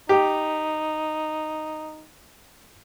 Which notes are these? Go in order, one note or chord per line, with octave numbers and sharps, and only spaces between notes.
D#4 G4